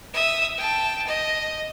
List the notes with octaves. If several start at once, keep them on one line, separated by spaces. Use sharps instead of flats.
E5 D#6
G5 A5
D#5